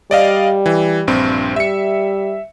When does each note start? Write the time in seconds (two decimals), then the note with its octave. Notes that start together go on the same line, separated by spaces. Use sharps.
0.11 G3 D5 D#5 F5
0.66 E3
1.07 A#1 G2 C4
1.56 G3 E5 C#7